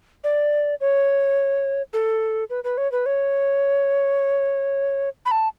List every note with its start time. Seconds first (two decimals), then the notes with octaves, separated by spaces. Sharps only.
0.24 D5
0.81 C#5
1.93 A4
2.50 B4
2.64 B4
2.78 C#5
2.92 B4
3.06 C#5
5.26 B5
5.31 A5